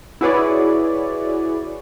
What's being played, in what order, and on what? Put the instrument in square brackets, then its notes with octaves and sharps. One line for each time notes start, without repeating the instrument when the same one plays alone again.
[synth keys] E4 F#4 G#4 B4 C#5 D5